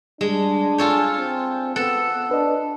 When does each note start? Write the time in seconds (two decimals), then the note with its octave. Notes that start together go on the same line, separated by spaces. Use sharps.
0.21 G3 G#3 D4
0.78 F4 A4 C#5 G#5 G6
1.19 C4
1.76 B3 A4 F#6
2.31 D4 B4 D#5